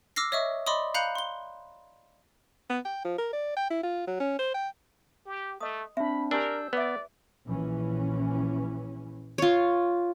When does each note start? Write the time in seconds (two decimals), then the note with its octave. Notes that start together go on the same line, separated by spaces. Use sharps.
0.16 D6 E6 F6 A#6 C7
0.32 C#5 D#5 E5 C#6 D#6
0.67 D5 D#5 B5 C6 D6 D#6
0.94 F5 A#5 B5 F#6 G6 C#7
1.15 C6 G7
2.70 B3
2.85 G5
3.05 F3
3.18 A#4
3.33 D5
3.57 G5
3.70 E4
3.83 F4
4.07 F#3
4.20 C#4
4.39 C5
4.54 G5
5.26 G4
5.60 A3 D#5 D#6
5.97 C4 D4 E5 B5
6.31 D4 G4 A#4 G#5 E6 G6
6.73 B3 B4 D5 E5
7.47 A#1 E3 C#4
9.38 F4 C#5